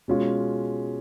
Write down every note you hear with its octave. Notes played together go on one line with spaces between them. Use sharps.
B2 G#3 C#4 F4